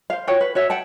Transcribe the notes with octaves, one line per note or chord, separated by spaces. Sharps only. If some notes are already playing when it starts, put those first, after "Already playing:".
C5 F5
F4 F#4 C#5 G5
B4
F#4 C#5 E5
F#5 G5 A5